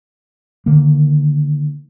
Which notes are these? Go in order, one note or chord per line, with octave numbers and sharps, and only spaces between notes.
D3 D#3 A#3